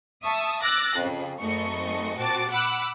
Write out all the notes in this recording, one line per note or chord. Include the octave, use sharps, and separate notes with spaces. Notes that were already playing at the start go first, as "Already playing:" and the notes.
E5 A5 C#6 D#6
D6 E6 F#6 A6 A#6
F2 C#3
G#1 F#2 A3 D#5 C#6
A#2 C4 F#4 A5 D6 A6
F#5 B5 D6 E6 F#6